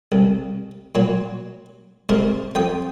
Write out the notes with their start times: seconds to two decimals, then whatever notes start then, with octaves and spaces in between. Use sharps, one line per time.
0.12 C2
0.95 A#2 F#3
2.09 G#2 C3 A#4 D#5
2.55 F2 G5 D#6